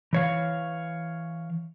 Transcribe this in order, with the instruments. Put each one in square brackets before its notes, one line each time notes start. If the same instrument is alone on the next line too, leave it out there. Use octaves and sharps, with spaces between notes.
[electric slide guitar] E3 C#5 F5